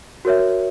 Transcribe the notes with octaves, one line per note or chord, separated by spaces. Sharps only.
F#4 A#4 C#5 E5